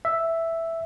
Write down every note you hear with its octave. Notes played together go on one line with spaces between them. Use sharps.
E5